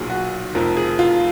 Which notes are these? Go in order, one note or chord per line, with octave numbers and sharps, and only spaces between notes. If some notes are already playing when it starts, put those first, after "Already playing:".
Already playing: B1 A#2 F#3 G#4
F#4
F1 F2 F3 A#4
G#4
F4